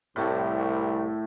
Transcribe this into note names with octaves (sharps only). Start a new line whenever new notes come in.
C2 A2 A3